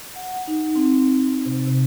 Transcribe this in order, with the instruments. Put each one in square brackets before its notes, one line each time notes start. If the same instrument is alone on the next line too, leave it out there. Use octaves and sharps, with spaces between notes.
[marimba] F#5
D#4
C4
C3
C3